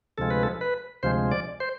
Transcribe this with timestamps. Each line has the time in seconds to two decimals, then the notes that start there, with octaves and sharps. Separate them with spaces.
0.18 D2 C3 F3 G#3 A4
0.30 B4
0.43 A4
0.61 B4
1.03 D2 C3 F3 G#3 C5
1.31 D5
1.60 C5